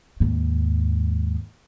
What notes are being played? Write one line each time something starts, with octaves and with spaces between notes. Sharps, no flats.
D#2 G#2